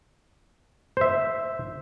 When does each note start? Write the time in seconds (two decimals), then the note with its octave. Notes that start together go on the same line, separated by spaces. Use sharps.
0.97 C5 E5